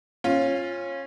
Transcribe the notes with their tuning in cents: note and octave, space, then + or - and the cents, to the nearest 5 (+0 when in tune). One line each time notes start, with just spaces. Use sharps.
C#4 -20 F4 +0